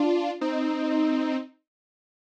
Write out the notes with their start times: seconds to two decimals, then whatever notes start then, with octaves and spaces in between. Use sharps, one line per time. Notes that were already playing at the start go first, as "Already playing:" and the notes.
Already playing: D4 F4
0.41 C4 D#4